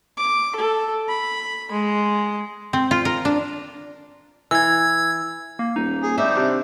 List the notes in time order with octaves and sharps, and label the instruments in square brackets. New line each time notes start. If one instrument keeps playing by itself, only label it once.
[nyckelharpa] D6
A4
B5
G#3
[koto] C4
F4
A#4
D4
[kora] E3 [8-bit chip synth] E6 G#6
[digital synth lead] A#3
[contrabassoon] D#1 [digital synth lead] D#4
[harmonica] G#4
[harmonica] C4 D#4 D5 [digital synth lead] C5 [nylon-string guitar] E5
[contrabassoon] C3 [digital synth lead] D4